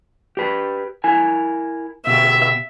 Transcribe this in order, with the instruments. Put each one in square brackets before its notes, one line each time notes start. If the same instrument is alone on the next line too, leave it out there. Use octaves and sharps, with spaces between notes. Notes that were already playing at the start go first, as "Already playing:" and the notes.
[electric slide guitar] G4 B4
E4 A#4 G#5
[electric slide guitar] B2 G4 [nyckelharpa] E5